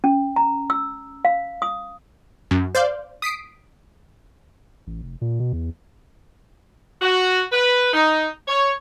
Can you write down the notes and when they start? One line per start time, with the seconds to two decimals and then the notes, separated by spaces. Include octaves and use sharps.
0.04 C#4
0.36 A#5
0.70 E6
1.25 F5
1.62 D#6
2.51 F#2
2.75 C5 D5 F5 G6
3.22 D#6 B6 C7 D7
4.87 A1
5.03 F1
5.21 A#2
5.39 B2
5.53 E2
7.01 F#4
7.51 B4
7.93 D#4
8.48 C#5